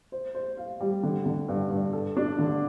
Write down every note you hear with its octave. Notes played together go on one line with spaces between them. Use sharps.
C5
C5
F5
G3
D3
D3
G2
G2
A4
D4
D3